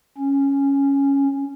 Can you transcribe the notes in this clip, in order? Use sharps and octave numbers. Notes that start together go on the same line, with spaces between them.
C#4